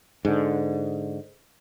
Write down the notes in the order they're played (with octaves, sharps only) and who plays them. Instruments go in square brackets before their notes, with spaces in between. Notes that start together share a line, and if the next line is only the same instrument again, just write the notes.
[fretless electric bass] G#2 D3